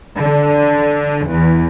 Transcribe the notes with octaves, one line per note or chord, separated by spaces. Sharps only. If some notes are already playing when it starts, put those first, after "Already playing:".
D3
E2